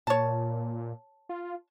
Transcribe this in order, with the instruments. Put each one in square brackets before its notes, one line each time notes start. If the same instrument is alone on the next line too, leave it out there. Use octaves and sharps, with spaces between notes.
[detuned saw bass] A#2 [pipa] C#5 A5
[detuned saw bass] F4